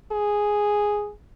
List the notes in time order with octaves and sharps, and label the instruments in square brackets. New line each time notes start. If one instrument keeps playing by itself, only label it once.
[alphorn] G#4